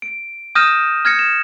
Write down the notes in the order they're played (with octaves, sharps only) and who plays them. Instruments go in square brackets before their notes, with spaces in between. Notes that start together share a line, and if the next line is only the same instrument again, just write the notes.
[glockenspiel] D7
D#6 F6 G6 A#6 D#7 E7
F6 G#6 A#6 C#7
E7